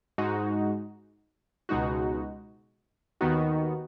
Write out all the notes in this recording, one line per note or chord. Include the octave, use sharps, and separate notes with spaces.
G#2 G#3 D#4 F#4
C#2 B2 G#3 D#4 F#4
D#2 D#3 B3 D#4 F#4